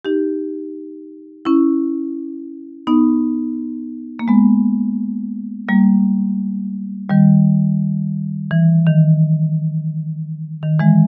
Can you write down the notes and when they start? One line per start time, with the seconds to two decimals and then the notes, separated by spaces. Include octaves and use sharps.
0.05 D#4 G4
1.45 C#4 E4
2.87 B3 D#4
4.19 A#3
4.28 G#3 B3
5.68 G3 A#3
7.10 D#3 G3
8.51 E3
8.87 D#3
10.63 D#3
10.79 E3 G#3